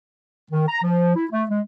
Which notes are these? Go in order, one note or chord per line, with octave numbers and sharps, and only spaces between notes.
D#3
A#5
F3
E4
A3
G#3